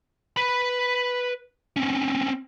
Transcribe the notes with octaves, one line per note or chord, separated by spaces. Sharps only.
B4 B5
C4 C#4